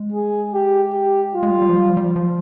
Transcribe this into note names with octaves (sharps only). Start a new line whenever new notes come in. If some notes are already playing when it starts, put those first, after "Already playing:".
Already playing: G#3
G#4
G4
G4
G3 F4
G#3
G3
G3
F3
G3
F3
G3
F3
F3